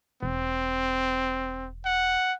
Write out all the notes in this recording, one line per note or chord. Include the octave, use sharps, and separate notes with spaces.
E1 C4
F#5